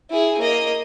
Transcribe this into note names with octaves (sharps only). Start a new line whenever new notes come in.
E4 G#4
A#3 D#5